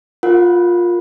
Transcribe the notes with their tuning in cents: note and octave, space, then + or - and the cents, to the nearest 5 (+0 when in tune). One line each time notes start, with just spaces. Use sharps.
F4 +10 A#4 +0 F#5 -20